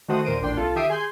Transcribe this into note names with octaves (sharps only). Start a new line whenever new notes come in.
D#3 A3 F#4 C5 F#5 D#6
D#2 A#2 A#4 C5 D7 D#7
A1 A#2 D4 G5 C6
C2 F4 A4
D#3 G4 E5 D#6 C7 D7
G#4 G#5 C6 G6